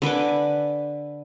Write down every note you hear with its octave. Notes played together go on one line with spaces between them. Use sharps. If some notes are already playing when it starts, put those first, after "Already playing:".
D3 B4 G#5 D6